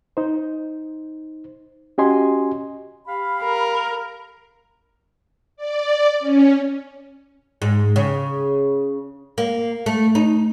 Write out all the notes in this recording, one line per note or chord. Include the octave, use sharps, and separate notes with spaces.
D#4 C5
C#4 F#4 G4 D#5 G#5 C6
G4 F5 B5
A#4
D5
C#4
G#2
C#3
A#3
A3
D#4